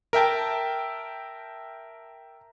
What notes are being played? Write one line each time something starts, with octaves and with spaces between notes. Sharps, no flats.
A#4 E5 G5 A5